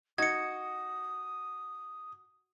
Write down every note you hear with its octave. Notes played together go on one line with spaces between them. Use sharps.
D#4 F#4 D#6 G#6 C#7